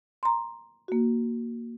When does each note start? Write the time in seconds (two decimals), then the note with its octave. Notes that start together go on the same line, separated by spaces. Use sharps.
0.23 A#5 C6
0.88 A#3 F#4